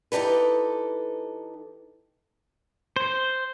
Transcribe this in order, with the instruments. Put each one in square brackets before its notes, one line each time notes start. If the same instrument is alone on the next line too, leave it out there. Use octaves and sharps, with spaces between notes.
[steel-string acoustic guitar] E3 D#4 G4 A4 B4
[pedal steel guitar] C5